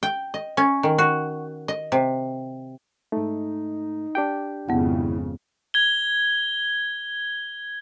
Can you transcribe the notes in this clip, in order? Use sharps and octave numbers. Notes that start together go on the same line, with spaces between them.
G5
D#5
C#4
D#3
F#4
D#5
C3
G#2 A3 D#4
D4 G4 G5
G#1 F2 C#3 B3 E4 F#5
G#6 G7